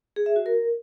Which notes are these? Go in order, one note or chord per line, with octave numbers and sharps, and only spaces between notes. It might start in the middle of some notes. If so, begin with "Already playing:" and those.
G#4
E5
F#4
A#4